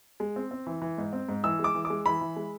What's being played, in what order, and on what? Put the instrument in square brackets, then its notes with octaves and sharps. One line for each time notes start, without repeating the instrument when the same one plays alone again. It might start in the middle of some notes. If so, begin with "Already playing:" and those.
[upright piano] G#3
C4
C4
E3
E3
G#2
C4
G#2
E3 E6
G#3
D6
E3
D6
G#3
E3 B5
E3
G#3